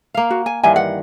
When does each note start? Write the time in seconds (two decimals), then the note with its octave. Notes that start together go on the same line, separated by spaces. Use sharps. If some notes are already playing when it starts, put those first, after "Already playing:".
0.14 A#3 F5
0.31 F#4
0.46 G#5
0.64 G2 D#3 E3 G#5
0.76 F#5